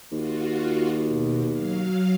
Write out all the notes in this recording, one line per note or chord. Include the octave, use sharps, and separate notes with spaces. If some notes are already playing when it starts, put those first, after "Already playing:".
D#2 F4 F#4
B2
F#3 F5